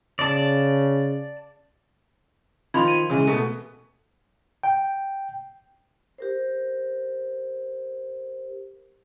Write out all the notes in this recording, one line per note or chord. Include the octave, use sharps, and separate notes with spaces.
C#3 D5 A5
D#3 F3 B5 C6 G#6
D#7
C#3 E3 G#3
B2 A3 B3
G5
G4 A#4 C5